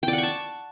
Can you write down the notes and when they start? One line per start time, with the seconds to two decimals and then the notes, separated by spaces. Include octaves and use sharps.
0.03 G5
0.08 D5
0.13 F#5
0.18 C#6
0.23 A5